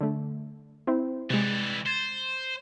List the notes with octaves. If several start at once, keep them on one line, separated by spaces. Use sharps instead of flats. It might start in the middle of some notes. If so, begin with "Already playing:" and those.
D3 A3
C4 E4 C5
C3 E3 G3 G#3
C5 G#6 A6 E7